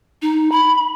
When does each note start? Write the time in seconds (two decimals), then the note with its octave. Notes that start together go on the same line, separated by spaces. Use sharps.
0.22 D#4
0.52 B5